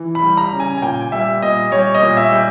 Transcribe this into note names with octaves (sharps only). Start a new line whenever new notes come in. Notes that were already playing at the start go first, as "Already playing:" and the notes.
Already playing: E3
B5
G3
A#5
C#3
G#5
G#5
A#2 G5
G3 E5
A#2 D#5
G3 C#5
D#5
A#2
E5
G3